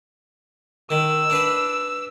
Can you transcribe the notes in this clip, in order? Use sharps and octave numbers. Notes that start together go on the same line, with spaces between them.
D#3 E6
D4 B4